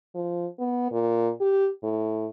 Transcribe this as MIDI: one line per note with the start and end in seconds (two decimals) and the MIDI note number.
0.15 0.46 53
0.59 0.89 59
0.91 1.30 46
1.41 1.69 67
1.83 2.27 45